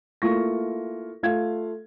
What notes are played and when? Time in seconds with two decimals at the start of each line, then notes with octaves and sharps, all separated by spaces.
0.22 A3 A#3 E4 F4 C#6 A#6
1.23 A3 F4 F5 G#6